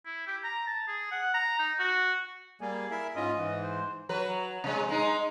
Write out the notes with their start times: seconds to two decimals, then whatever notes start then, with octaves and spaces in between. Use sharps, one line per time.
0.06 E4
0.27 G4
0.44 A#5
0.67 A5
0.88 G#4
1.11 F#5
1.34 A#5
1.59 D#4
1.79 F#4
2.61 G3 A#3 G#4
2.91 E4 A#4 E5
3.16 G#2 C#4 F4 D#5
3.37 G#2 E3
3.63 C5
4.09 F#3 B4
4.64 C3 G#3
4.89 G#3 D#4